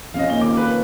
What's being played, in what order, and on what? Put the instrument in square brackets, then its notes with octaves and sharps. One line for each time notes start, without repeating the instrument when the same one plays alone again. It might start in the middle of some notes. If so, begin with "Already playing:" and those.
[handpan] F3 C4 C#4 [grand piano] D#5 F5
[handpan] A#3 [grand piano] D#4 G7
[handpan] D#3 F4 A#4 [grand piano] D6
[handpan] F#4 [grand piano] B4